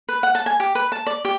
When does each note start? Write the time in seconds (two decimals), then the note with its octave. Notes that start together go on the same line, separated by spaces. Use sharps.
0.09 B4
0.23 F#5
0.35 A5
0.46 G#5
0.60 G4
0.75 B4
0.92 A5
1.07 D5
1.25 G4